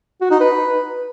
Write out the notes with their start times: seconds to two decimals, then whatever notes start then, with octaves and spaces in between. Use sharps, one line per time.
0.21 F#4
0.31 D#4
0.41 B4